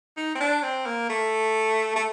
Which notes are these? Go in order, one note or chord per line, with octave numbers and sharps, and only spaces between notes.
D#4
C4
D4
C4
A#3
A3
A3